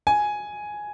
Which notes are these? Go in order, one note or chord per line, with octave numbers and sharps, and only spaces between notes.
G#5